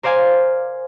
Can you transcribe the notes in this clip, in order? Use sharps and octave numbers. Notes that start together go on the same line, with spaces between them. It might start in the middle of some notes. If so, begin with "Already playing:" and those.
A#4 C5 D5 F5 G#5